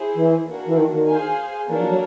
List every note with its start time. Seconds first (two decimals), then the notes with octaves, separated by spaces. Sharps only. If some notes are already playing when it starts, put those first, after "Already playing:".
Already playing: E4 G#4 C5
0.14 E3
0.45 A#3 D4 F#4
0.66 E3
0.76 D#3
0.92 D#3
1.07 G#4 C5 F5 G#5
1.68 E3 A#3 D4 F#4 A4 C#5
1.79 F3
1.89 F#3